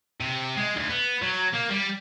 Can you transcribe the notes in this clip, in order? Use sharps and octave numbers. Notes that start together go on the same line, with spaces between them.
C3
G#3
D2
B3
F#3
A#3
G3